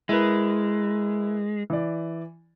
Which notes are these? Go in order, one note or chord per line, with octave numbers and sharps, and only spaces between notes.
G#3 E4 A#4 B4
E3 D5